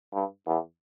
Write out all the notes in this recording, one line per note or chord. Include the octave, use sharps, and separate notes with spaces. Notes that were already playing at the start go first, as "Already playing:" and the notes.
G2
E2